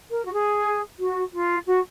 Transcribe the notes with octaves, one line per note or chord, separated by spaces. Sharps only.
A#4
F#4
G#4
F#4
F4
F#4